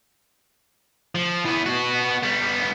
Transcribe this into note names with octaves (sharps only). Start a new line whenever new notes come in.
F3
E3 B3
B3 F#4
G3 B3